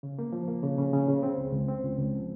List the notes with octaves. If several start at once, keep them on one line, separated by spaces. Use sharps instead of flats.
C#3
A#3
F3
A#3
C#3
C#3
C#3
C#3
C4
C#2
C#2
C4
C#2
C#2
F3